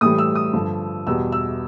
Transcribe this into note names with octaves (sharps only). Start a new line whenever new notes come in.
A2 E3 G3 D#6
E6
D#6
G2 D3 F3
E2 B2 G3 E6
E6